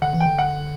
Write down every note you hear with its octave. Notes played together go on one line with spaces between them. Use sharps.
D3 F#5
E3
G5
D3
F#5